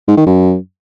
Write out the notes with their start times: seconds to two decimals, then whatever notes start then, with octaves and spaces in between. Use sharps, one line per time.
0.08 G#2
0.17 D#3
0.26 F#2